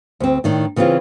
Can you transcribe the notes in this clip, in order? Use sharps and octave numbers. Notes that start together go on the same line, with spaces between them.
D2 C4
A2 D#3 D4
C#3 E3 B3 C4 F4 G#4